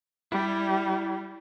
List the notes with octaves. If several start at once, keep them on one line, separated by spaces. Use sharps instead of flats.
G3 E4